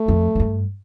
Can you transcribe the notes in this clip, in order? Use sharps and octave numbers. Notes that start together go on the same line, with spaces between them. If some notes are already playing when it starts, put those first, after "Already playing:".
Already playing: A3
F2
F2
G2